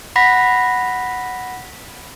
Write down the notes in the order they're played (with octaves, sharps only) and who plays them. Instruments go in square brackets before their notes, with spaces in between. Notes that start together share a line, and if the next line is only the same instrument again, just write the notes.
[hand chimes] F#5 B5 A#6 B6